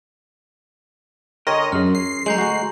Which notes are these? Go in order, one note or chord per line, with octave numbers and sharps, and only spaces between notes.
D3 G4 A#4 C#5 D#5 G5 C6 A#6
F#2 C#4 G#4 F6
C7
F#3 G#3 A3 A#5 G6 F#7
D2 G#3 A3 F#4